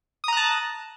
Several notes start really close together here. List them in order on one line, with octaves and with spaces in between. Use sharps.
D#6 A#5 F#6 A5